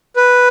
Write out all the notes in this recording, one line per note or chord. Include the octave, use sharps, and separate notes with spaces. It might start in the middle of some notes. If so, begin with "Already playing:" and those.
B4